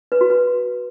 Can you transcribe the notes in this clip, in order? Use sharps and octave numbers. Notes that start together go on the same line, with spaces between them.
B4
F#4
B4